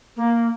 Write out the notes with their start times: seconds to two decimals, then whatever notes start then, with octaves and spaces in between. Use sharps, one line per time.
0.17 A#3